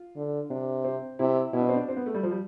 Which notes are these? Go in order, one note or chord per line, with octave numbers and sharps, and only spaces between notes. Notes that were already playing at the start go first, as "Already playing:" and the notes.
Already playing: F4
D3
C3 D4
C4
C3 E4
B2 E4
D4
C4
D4
C4
B3
A3
G3
F3
G3